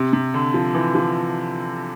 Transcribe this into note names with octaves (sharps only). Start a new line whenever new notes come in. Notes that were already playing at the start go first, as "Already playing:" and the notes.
Already playing: C3
C3
D3
F3
E3
F3